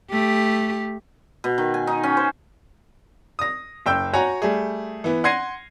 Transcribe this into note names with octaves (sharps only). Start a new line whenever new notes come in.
A3 G4
B2
D#3
G#5
D#4
C#4
C5
D#6 A#6
F#1 G5 E6 G6
F#4 C#5 F#5 G#5 A#5
G3 A3 G#4
E3 B3
F#5 C6 G#6 A#6 C7 D#7